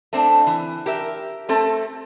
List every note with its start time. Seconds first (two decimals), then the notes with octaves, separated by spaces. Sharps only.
0.13 A3 C4 D4
0.47 E3
0.86 G4 A#4 E5
1.49 A3 C4 A4